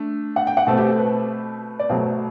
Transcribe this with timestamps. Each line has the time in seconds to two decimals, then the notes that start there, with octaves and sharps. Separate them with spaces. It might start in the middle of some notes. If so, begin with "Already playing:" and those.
Already playing: A3 D4
0.36 F#5
0.47 G5
0.57 F#5
0.67 B2 A3 C4 A4
0.78 G4
0.88 A4
0.98 B4
1.79 D5
1.89 B2 F#3 A3 C5